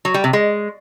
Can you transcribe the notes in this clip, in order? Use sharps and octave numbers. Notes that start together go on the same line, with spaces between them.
F#3
G3
C3
G#3